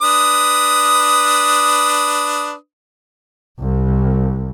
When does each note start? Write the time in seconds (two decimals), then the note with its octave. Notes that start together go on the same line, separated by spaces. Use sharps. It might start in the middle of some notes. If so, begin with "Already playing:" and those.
0.02 D4 B4 D#6
3.61 C2